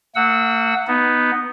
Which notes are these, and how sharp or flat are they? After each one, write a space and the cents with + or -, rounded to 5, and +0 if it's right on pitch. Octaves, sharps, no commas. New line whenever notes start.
A#3 -45 F#5 +0 E6 -25
B3 +0 D#4 +0